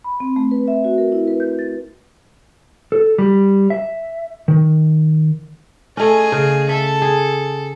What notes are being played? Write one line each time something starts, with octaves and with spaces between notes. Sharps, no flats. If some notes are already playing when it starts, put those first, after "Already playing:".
B5
C4
A3
B4
E5
F#4
A#4
E4
B4
G6
A6
A4
G3
E5
D#3
A3 C#4 G#4 D#5
C#3
A4 E5
G#4